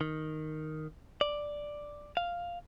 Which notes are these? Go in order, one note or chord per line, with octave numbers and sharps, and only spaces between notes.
D#3
D5
F5